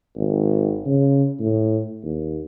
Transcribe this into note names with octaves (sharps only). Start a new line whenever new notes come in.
G#1
C#3
A2
D#2